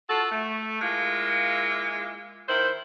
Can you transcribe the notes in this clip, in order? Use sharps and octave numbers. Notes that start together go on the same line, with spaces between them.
F4 F#4 A4
A3
G#3 A#3 E4 F4
D#3 E4 C5